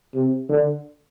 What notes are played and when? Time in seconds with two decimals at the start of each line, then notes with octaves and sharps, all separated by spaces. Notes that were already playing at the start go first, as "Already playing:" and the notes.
0.14 C3
0.49 D3